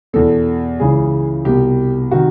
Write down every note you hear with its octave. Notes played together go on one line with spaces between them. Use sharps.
E2 B2 A4
C#2 C#3 E3 G#4
C2 B2 G4
C3 D#3 F#4